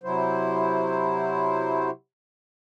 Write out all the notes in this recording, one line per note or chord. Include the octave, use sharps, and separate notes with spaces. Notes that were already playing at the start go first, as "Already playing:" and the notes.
C3 F#3 E4 C5